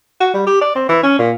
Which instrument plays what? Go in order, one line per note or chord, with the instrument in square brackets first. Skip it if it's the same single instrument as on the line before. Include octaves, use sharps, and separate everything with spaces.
[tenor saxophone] F#4
G3
G4
D5
C4
E3
C#4
A#2